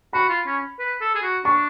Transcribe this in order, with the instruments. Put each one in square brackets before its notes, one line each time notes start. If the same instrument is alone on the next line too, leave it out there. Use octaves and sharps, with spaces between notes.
[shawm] F#4 [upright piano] B5
[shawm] F4
C#4
B4
A4
G#4
F#4
[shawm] D4 [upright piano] C#6